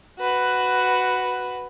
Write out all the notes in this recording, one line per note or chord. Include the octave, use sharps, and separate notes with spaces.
F#4 B4